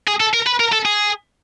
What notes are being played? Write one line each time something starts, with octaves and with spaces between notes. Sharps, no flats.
G#4
A4
A#4
B4
A#4
A4
G#4